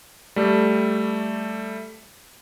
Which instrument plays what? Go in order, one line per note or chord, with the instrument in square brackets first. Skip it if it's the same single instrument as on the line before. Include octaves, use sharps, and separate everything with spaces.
[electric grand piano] G3 A3